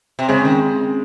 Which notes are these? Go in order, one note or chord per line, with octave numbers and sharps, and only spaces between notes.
C3
C#3 G#3 C4
D#3